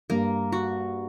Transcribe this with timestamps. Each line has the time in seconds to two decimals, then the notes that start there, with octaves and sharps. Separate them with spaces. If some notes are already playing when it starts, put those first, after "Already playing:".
0.10 G2 A#3
0.52 F#4